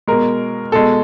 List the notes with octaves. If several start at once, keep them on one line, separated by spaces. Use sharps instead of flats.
B2 G#3 A#4
B2 G#3 A4